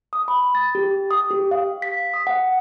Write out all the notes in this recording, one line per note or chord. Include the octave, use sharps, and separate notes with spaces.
D#6
B5
A6
G4
D#6
G4
F5
B6
D#6
F#5